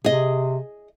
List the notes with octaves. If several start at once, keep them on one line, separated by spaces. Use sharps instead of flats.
C3 G#4 D#5